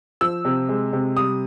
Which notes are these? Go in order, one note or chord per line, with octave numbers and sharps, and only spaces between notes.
F3 E6
C3
G#3
C3
G3 D#6